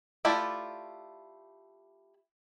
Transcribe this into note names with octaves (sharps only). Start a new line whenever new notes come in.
A3 E4 F4 G4 D5